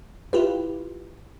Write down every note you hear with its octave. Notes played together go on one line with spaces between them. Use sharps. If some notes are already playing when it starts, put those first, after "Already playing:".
E4 F4 G4 B4